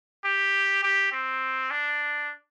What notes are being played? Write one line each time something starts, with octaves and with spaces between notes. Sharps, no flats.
G4
G4
C4
D4